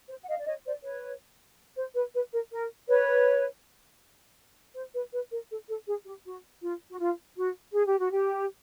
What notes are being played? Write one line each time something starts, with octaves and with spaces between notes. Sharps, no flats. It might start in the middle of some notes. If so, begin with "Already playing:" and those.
C5
F#5
D#5 F5
D5
C#5 D#5
C5 D5
B4 C#5
C5
B4
B4
A#4
A#4
B4 C#5
C5
B4
B4
A#4
A4
A4
G#4
G4
F#4
F4
F#4
F4
F#4
G#4
G4
F#4
G4